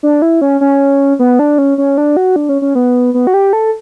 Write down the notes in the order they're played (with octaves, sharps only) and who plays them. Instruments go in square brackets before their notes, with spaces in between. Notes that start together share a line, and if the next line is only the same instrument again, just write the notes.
[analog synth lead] D4
E4
C#4
C#4
B3
D4
C#4
C#4
D4
F#4
D4
C#4
C#4
B3
B3
F#4
G4
A4